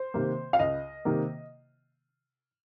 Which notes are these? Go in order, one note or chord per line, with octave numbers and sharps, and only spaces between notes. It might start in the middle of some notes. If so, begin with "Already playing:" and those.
Already playing: C5
C3 D#3 A#3
F5
C#2 D#5
C3 D#3 A#3